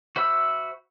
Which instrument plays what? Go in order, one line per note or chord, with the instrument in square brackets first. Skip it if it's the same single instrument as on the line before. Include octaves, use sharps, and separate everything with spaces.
[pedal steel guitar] F#4 C5 E5 B5 E6